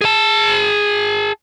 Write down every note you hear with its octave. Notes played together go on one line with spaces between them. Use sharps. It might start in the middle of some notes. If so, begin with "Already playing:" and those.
G#4 A5